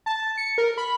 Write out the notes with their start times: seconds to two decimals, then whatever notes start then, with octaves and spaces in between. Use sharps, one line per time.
0.06 A5
0.37 C#7
0.58 A#4
0.78 B5